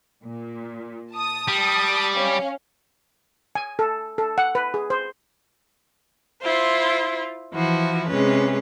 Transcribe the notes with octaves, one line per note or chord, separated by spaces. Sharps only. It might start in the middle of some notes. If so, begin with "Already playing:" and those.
A#2
A5 D#6
G3
C#4 F5
G#5
A4
A4
F#5
B4
G#4
C5
E4 F4 C5
E3 F3 E4 F#4
C3 G#3 C#4 B4